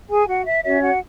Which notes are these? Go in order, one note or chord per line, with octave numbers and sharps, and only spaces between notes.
G#4 G#5
F#4 F#5
E5
C#4 F#4 C#5 E5
F#4 F#5